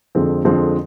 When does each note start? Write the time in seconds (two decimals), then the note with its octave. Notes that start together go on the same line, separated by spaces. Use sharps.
0.15 F2 D3 F3 G#3 C4
0.44 F2 D3 F3 G#3 C4